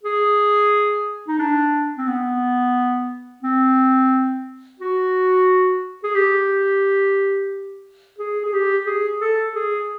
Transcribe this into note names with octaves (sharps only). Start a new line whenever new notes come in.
G#4
D#4
D4
C4
B3
C4
F#4
G#4
G4
G#4
G#4
G4
G#4
A4
G#4